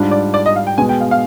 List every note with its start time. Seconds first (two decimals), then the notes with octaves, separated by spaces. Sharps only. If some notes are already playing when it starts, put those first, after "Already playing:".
Already playing: G#2 G3 D4 F4
0.11 D5
0.34 D5
0.46 D#5
0.56 F5
0.67 G5
0.78 B2 G#3 B3 G#5
0.89 G5
1.00 F5
1.11 F5